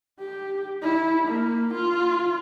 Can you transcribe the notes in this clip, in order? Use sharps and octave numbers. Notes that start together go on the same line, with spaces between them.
G4
E4
A#3
F4